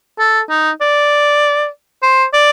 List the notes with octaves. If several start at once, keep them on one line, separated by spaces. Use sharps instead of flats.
A4
D#4
D5
C5
D5